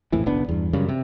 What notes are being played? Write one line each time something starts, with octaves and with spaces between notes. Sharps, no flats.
A#1 F2 A2 E3
F#1 B1 B3 D4
E2 G2
F#2 C#3 G3
C3